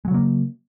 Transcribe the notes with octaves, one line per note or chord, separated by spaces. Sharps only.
C#3 F#3 G#3 A#3